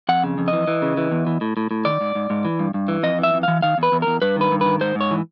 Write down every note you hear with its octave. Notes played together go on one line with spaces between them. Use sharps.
F2 F#5
C#3
F2
E3 D#5
E3
C#3
E3
E2
E3
A2
A2
A2
D#3 D5
G#2
G#2
G#2
E3
G2
G2
E3
F2 D#5
E3 E5
F2
E3 F5
D#3 F5
E2
B4
E2
E2 A#4
G2 B4
D#3 B4
G2
D#3 B4
G#2 C5
G#2
C#5
E3